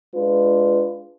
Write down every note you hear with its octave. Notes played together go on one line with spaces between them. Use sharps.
G#3 D4 F4 B4